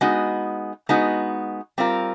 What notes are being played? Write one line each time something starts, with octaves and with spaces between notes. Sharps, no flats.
G#3 B3 D#4 F#4
G#3 B3 D#4 F#4
G3 C4 F4 A#4